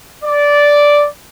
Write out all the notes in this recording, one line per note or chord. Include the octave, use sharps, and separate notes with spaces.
D5